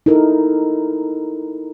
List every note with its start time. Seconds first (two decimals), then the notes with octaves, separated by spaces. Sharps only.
0.06 D#4 E4 A4 A#4